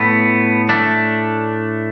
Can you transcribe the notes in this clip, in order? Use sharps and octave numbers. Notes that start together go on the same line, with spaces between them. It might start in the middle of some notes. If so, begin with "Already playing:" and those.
Already playing: A2 A3 B3
A3 D4